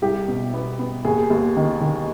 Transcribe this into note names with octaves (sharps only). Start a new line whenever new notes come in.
C2 G4
B2
B3
B3
D#2 G#4
D#2
D#3
D#3